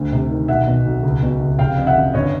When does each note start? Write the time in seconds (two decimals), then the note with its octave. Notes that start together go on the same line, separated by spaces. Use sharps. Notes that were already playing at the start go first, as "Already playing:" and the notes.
Already playing: D2
0.12 C3
0.30 D#3
0.48 B1 E5 F#5
0.67 B2
0.86 B1
1.03 C#2
1.23 B2
1.41 C#2
1.59 F1 F5 G5
1.77 F2
1.87 E5 F#5
1.96 C#3
2.14 G1 C#5 D#5